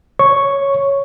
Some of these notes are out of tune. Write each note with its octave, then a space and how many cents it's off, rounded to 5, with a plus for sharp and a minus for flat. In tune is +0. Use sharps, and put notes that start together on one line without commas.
C#5 +0 C#6 +0